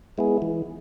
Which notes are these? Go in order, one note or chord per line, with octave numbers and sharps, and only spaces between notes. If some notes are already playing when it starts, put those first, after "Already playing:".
G#3 B3 E4 G#4
E3